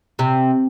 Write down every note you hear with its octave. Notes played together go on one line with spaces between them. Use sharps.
C3